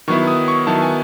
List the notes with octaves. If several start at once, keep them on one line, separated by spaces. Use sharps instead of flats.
D#3 F#3 B3 E4 C#6
D#6
C#6
D#3 F#3 B3 E4 A5
G#5